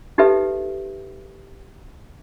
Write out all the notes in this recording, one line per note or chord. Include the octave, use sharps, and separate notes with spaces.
D#4 G4 A4 B4 E5